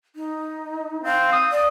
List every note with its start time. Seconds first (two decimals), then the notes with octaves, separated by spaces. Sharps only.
0.16 D#4
1.03 C4 F5
1.32 D#6
1.52 D5